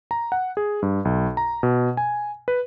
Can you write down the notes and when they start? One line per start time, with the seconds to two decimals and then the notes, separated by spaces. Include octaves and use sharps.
0.11 A#5
0.32 F#5
0.57 G#4
0.82 G2
1.05 B1
1.37 A#5
1.63 B2
1.97 G#5
2.48 B4